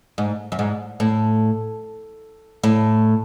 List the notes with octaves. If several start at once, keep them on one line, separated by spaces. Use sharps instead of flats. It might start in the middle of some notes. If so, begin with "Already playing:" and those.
G#2
F#2
G#2
A2
A2